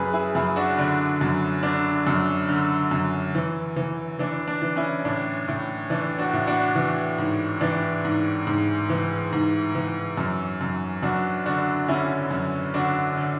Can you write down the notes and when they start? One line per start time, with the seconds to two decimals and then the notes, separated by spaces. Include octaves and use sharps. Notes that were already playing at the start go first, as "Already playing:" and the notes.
Already playing: F#2 G#4 B4
0.13 E4 G#4
0.35 F#2 E4 G#4
0.56 D4 F#4
0.78 D3 D4
1.21 F#2
1.63 D3 D4
2.07 F#2
2.49 D3
2.91 F#2
3.35 E3
3.76 E3
4.19 E3 D4
4.48 D4
4.62 E3
4.76 C#4 E4
5.05 A2 D4
5.48 A2
5.90 E3 D4
6.19 D4 F#4
6.33 A2
6.47 D4 F#4
6.75 E3
7.18 G#2
7.61 E3 D4
8.05 G#2
8.47 G#2
8.90 E3
9.33 G#2
9.75 E3
10.17 F#2
10.61 F#2
11.03 F#2 D4 F#4
11.46 D3 D4 F#4
11.88 D3 C#4 E4
12.31 F#2
12.74 D3 D4 F#4
13.17 D3